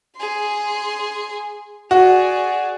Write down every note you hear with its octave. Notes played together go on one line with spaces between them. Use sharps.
G#4 C6
F#4 G#4 D5